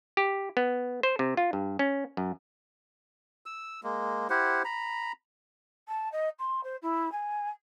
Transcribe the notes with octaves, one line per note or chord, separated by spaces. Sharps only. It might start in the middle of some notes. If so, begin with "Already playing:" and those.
G4
B3
C5
C3
F4
G2
C#4
F#2
E6
G#3 A#3
E4 G4 C5 F#5
A#5 B5
A5
D#5
C6
C5
E4
G#5